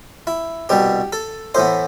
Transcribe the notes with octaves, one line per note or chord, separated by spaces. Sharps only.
E4
C2 B2 G3 G4
A4
A2 E3 B3 C5